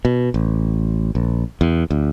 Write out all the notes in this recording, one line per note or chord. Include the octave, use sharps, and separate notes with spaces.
B2
A1
A#1
E2
D2